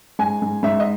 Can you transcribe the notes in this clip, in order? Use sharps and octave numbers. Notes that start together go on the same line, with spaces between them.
G#2 G#5
G#2
G#2 E5
D#5